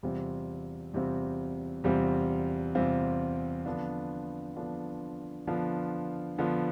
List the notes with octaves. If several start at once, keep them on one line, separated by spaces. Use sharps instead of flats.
E2 C3 G3 C4 F4
E2 C3 G3 C4 F4
E2 C3 G3 C4 F4
E2 C3 G3 C4 F4
D3 F3 B3 D4 F4
D3 F3 B3 D4 F4
D3 F3 B3 D4 F4
D3 F3 B3 D4 F4